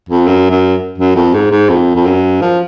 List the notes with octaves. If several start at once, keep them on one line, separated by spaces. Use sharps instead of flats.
F2
F#2
F#2
F#2
F2
G#2
G#2
F2
F2
F#2
F3